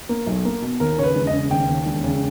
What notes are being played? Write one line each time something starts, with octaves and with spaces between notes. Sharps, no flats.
A#3
B1
A#3
B2
D#2 A#4
C#3 C#5
B4
E1
D#5
C#3
D#2 G5
D#2
E1
C#3